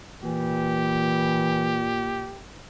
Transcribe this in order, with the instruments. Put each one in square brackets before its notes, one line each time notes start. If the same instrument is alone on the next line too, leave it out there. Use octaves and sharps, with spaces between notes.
[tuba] A#2 [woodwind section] E3 [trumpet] G4